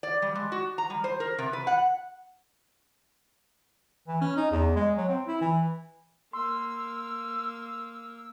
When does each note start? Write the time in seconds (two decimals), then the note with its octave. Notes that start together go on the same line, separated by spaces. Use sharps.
0.03 D5
0.22 G3
0.35 G#3
0.52 F#4
0.78 A#5
0.90 G3
1.04 C5
1.20 A#4
1.38 C3
1.53 B4
1.67 F#5
4.08 E3
4.21 C#4
4.37 D#4
4.51 E2
4.76 G#3
4.97 F#3
5.09 C4
5.27 E4
5.41 E3
6.33 A#3 C6 E6